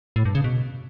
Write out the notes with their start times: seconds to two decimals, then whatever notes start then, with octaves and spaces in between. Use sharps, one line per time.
0.16 A2
0.25 G2
0.35 C#3
0.44 B2